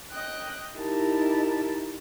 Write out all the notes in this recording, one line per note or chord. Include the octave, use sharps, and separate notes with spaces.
D#5 G5 F#6
D#4 E4 G4 A#4 A5